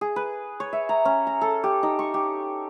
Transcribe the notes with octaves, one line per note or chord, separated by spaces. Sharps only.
G#4
B4
C#5
E5
A#5
C#4
A#5
A4
G4
D#4
C#6
G4